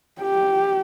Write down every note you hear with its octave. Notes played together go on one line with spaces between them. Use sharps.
G4